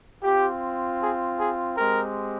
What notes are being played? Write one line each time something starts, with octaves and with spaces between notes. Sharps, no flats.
C4 F4 G4
G#4
G#4
G#3 C4 G4 A#4